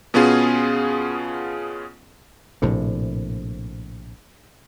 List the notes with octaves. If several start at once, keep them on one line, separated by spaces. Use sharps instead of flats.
B2 B3 C#4 F4 G#4
A#1 A2 C3